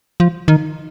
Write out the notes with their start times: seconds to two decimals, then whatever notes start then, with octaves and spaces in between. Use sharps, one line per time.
0.20 F3
0.48 D#3